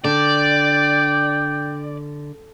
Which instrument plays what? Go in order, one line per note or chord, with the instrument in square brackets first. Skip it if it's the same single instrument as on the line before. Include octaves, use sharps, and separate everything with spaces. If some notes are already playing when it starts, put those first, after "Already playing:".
[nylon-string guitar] D3 [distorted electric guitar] D5 [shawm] G5